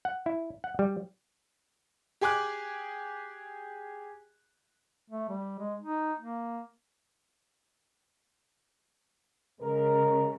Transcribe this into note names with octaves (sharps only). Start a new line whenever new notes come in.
F#5
E4
F#5
G3
G4 G#4 G#5 D6 F#6
A3
G3
G#3
D#4
A#3
C#3 G#3 A#4